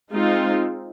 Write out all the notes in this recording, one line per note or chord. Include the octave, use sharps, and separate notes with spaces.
G#3 C4 D#4 F4